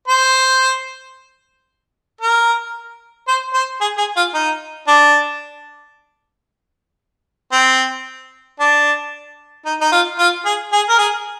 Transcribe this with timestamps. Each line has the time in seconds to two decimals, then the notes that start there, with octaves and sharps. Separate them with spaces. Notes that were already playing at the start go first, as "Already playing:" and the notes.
0.08 C5
2.21 A#4
3.28 C5
3.54 C5
3.81 G#4
3.98 G#4
4.16 F4
4.34 D#4
4.87 D4
7.52 C4
8.60 D4
9.65 D#4
9.81 D#4
9.92 F4
10.19 F4
10.45 G#4
10.73 G#4
10.89 A#4
10.98 G#4